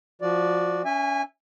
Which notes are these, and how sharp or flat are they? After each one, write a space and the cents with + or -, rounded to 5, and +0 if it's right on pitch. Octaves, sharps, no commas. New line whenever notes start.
F3 +0 F#4 -20 D5 +0
C#4 +25 E5 +0 G#5 -25